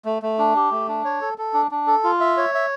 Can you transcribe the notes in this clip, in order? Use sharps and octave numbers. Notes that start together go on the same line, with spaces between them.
A3
A3
D4
G4
A3
D4
C#5
A4
A4
D4
D4
A4
F4
E5
C#5
E5